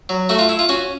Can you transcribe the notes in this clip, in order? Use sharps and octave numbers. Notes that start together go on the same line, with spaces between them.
F#3
A3 F#4
F4
E4
F4
C#4 F#4